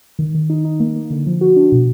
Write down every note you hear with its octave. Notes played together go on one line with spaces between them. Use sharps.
D#3
D#3
D#4
D#4
A#3
A#3
D3
F3
F#4
D4
B2